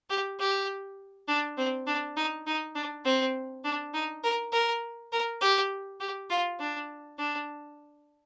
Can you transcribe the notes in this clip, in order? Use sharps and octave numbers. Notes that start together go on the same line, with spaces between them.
G4
G4
D4
C4
D4
D#4
D#4
D4
C4
D4
D#4
A#4
A#4
A#4
G4
G4
F4
D4
D4